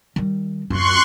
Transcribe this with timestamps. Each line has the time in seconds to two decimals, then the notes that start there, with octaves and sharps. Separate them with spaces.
0.16 D#3 G3
0.70 D1 F#2 F4 C6 C#6 F#6